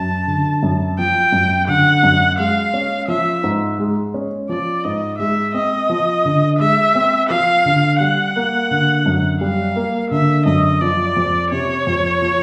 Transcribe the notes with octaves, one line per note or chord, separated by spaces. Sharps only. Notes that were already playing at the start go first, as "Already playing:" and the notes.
Already playing: F#2 A5
D3
F#2
F3 G5
F#2
D3 F#5
F#2
G#3 F5
C#4
F3 E5
G#2
G#3
C#4
F3 D5
G#2 D#5
G#3 E5
C4 D#5
F3
D3
G#3 E5
C4
F3 F5
D3
G3 F#5
A#3
D3
F#2
G3 F5
A#3
D3 E5
F#2 D#5
F3 D5
F2
C3 C#5
F2
F3